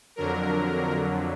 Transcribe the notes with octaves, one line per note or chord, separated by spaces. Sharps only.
F2 D3 F#3 A#4